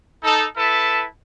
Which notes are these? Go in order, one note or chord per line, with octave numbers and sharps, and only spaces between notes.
D#4 A4
E4 A4 B4 A5